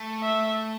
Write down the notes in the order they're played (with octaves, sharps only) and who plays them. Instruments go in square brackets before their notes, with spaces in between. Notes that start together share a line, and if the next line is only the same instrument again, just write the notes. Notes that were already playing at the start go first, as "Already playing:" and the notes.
Already playing: [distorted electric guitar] A3
[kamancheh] E5